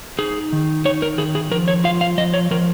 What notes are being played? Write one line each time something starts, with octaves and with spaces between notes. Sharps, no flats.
D#4 G#4
D#3
D#4 C#5
A#4
D#3 G#4
G#4
F3 A#4
C#5
F4 F5
F5
F3 D#5
C#5
F3 A#4